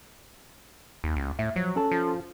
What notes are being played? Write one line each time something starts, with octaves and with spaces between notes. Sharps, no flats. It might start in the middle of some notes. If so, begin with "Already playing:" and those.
D#2
C#2
A2 E5
F3 F#3
C#4 A4 A5
F3